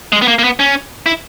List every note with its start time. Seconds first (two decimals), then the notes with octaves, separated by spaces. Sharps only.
0.12 G#3
0.22 B3
0.28 A#3
0.39 A#3
0.44 B3
0.59 C#4
1.06 E4